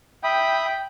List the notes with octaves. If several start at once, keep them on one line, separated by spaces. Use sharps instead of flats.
E5 G5 B5 D#6